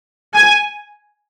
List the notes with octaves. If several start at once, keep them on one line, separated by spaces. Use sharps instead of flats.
G#5